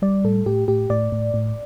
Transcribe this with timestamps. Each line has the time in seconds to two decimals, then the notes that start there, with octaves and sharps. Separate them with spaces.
0.02 G3 D5
0.24 A2 A4
0.46 A2 G4
0.68 A2 G4
0.90 A2 D5
1.12 A2
1.34 A2